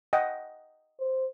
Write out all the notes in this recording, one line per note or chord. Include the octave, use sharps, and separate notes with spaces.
D#5 F#5 G5
C5